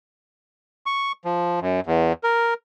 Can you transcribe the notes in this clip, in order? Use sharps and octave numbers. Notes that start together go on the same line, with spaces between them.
C#6
F3
F#2
E2
A#4